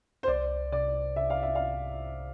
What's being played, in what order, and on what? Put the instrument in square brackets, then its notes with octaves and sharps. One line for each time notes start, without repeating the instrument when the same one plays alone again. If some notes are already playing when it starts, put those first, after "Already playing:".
[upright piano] C5
[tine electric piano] C2 [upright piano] D5
[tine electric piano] C3 [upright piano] D5
[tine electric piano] C3 [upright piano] E5
[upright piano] F5
E5
F5